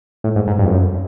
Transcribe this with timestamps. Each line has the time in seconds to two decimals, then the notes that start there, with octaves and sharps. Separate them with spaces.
0.24 A2
0.36 G#2
0.47 G#2
0.59 G2
0.65 F2
0.71 F#2